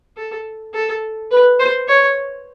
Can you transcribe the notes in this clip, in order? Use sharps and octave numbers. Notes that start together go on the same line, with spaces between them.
A4
A4
B4
C5
C#5